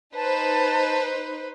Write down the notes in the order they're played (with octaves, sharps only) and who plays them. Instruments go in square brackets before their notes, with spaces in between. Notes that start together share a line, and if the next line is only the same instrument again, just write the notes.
[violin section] D#4 B4 C5 [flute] A5